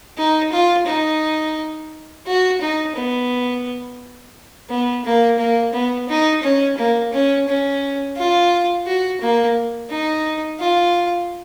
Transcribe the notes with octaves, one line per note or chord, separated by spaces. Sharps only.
D#4
F4
D#4
F#4
D#4
B3
B3
A#3
A#3
B3
D#4
C#4
A#3
C#4
C#4
F4
F#4
A#3
D#4
F4